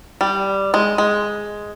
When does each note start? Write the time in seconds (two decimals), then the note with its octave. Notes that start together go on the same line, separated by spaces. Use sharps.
0.21 G3
0.74 G#3
0.98 G#3